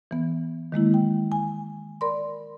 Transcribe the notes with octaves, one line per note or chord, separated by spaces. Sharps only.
E3 B3
D#3 G#3 A#3 E4
G5
G#5
A#4 D5 B5 C6